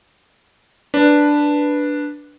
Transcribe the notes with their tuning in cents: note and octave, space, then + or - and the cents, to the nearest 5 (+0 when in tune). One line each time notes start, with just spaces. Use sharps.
D4 +0 B4 -5